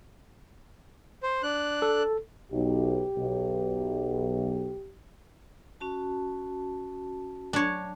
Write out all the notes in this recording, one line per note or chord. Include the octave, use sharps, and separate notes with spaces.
C5
D4 F#6
A4
B1 G4
B1
C#4 F#4 A5
F#3 D4 C#5 C#6